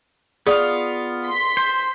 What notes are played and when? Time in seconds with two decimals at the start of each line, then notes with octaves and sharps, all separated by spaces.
0.47 B3 F4 G#4 D5 F5 D#6
1.24 C6 B6
1.57 C5